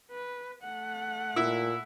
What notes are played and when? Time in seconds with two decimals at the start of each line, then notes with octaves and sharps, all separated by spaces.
0.11 B4
0.63 A3 F#5
1.36 A#2 E4